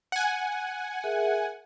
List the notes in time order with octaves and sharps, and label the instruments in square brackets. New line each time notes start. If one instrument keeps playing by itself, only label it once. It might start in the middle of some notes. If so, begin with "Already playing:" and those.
[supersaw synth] F#5 G#5
[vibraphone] G#4 A#4 E5